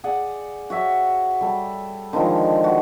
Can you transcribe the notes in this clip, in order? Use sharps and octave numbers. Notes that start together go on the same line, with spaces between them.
G#4 D5 F#5 G#5
F#4 C#5 E5 G#5
G3 A4
D3 D#3 F3 G#3
F#4